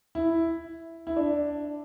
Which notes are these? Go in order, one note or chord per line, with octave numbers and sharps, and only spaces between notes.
E4
E4
D4